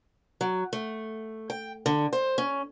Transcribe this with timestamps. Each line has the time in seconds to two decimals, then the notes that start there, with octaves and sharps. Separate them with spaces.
0.41 F#3
0.73 A3
1.50 G5
1.86 D3
2.13 C5
2.38 C#4